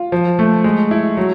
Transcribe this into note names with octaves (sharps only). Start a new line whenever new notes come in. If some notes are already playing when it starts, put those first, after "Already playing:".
Already playing: F4
F3
A3
G#3
E4
F#3